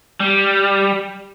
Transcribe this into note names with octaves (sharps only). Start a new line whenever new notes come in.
G3